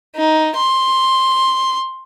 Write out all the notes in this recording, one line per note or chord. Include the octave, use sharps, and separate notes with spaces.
D#4
C6